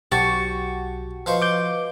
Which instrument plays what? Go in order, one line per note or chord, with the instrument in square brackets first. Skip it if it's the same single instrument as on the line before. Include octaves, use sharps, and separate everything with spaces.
[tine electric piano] B1 [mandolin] F#4 A5 [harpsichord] G4
[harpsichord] F3 C5 C#6 [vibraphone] B4 D#5 F5
[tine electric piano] D6 G6